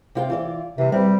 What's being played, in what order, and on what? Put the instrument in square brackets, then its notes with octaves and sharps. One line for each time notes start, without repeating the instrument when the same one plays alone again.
[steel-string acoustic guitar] C3 F4 G5
E3 F4 D5
[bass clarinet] C3 [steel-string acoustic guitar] E3 G3
[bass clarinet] G3 [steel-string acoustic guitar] C4 G4